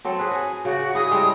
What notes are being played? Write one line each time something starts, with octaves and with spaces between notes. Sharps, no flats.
F#3 C4 A4
G#4 B4
F#4 G#5
C#3 F#4 D5
E4 G#4 D#6
G3 G#3 A4